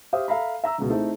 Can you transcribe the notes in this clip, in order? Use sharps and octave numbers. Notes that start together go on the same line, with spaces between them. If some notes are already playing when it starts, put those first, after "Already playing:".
G4 C5 E5 F5 D#6
A4 E5 F5 A#5 B5
E5 A#5 E6
C#2 B2
A3 C4 D#4 E4 G#4 A4